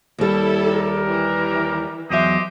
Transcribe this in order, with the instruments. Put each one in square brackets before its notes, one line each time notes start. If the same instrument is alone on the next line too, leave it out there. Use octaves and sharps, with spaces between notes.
[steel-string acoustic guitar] D#2 G3 [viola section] E4 A4
[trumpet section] G4 A#4
[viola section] E3
[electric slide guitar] E2 F#3 E5 [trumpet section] G4 C5 D#5